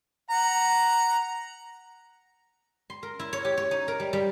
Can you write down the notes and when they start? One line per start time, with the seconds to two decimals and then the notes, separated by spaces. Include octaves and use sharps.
0.30 F#5 A#5
2.90 C6
3.03 A#4
3.19 E4
3.33 C#5
3.45 G4
3.57 C#5
3.71 D#4
3.88 A#4
4.00 G3
4.13 G3